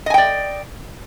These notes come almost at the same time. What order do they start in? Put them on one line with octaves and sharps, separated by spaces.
D#5 G#5 G5 D5